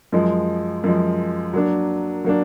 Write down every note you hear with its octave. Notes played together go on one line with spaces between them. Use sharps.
F#2 F3 G#3
F#2 F3 G#3
F#3 A#3 D4
F#3 A#3 D4